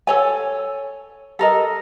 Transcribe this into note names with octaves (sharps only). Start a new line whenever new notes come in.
A4 C#5 G#5
A4 A#4 D#5